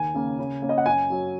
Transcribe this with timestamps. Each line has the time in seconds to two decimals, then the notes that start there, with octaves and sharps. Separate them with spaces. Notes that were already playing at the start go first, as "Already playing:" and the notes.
Already playing: D#2 G#5
0.14 C#3 A#3 C#4
0.38 C#3
0.62 A#3 C#4
0.69 D#5
0.78 F#5
0.86 F#2 G#5
1.10 F#3 C#4